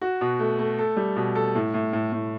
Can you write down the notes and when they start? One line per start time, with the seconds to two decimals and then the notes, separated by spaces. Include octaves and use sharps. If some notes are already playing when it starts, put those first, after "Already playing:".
0.01 F#4
0.21 B2
0.39 A3
0.59 A3
0.79 A4
0.97 G3
1.16 B2
1.35 A4
1.55 A2
1.74 A2
1.93 A2
2.12 A2